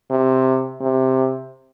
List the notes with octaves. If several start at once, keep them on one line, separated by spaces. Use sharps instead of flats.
C3
C3